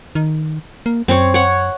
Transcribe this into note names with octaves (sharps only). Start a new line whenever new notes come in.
D#3
A#3
F#2 C4 C#5
C#5 F#5